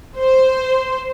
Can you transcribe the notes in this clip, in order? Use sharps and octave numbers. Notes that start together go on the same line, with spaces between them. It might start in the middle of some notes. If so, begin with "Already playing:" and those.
C5